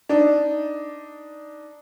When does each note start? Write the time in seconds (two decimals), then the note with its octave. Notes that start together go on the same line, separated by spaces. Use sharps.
0.09 D4 D#4